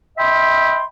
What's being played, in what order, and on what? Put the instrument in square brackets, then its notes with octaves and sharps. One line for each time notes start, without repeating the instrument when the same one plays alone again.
[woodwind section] D#5 E5 G5 B5 C6